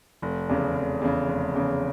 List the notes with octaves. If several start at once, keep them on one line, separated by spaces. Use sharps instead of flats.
F1
E2 C#3
F1
E2 C#3
F1
E2 C#3